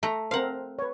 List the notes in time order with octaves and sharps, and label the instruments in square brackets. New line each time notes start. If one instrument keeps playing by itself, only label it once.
[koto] A3 [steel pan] A#5
[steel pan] C4 A#4 C5 [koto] F5 F#5
[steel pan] B4 C#5